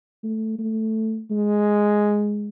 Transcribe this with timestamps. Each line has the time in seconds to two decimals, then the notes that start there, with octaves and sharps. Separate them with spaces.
0.24 A3
0.59 A3
1.31 G#3